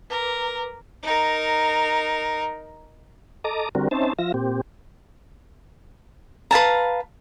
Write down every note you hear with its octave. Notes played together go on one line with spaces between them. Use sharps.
A#4 B4 D6
D#4 A#4
A4 D#5 A#5 D6
D3 G3 C4 F#4 A#4
C4 C#4 D#4 C5 E5 A5
F3 F4 E5 A#6
A#2 C4 G4
B4 F5 A5 A#5